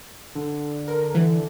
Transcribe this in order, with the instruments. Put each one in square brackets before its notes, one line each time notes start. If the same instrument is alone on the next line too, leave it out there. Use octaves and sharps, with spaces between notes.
[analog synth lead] D3
[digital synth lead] A#4
E3